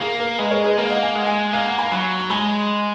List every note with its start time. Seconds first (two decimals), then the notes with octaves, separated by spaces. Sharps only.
0.01 A#3 G#4
0.20 A#4
0.38 G#3 G#4 B4
0.51 A#4 C#5
0.64 G#4 B4
0.77 A#3 A#4
0.90 D#5 F#5
1.03 G#5
1.14 G#3 F#5
1.26 F5 G#5
1.53 A#3 F5 G#5
1.66 F#5 A#5
1.78 G#5 B5
1.91 F#3 G#5 B5
2.20 C#6
2.30 G#3 G#5 B5